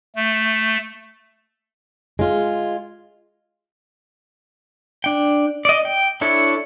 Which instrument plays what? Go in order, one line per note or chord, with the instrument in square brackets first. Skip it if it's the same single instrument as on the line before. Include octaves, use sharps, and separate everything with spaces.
[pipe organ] A3
[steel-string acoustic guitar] G#3 F4
[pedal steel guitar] D4 G5
D5 D#5
G5
D4 E4 A4 C#5